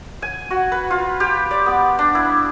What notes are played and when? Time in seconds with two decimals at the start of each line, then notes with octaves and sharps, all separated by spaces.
0.22 G#5
0.51 F#4
0.72 B4
0.91 F4
1.20 G4
1.51 D5
1.66 B3
1.99 D4
2.15 E4